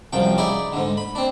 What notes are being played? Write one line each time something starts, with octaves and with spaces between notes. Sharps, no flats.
C2 F#2 F3 G5
D#4 E4 G#4 D5 E5
G#2 D3
B5
C4 D4